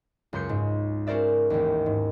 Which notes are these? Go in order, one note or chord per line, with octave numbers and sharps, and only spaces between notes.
C#2 F#2 C6 G6 C#7
G#2
C#4 F#4 A#4 C5 D5 E5
A1 D#2
G#2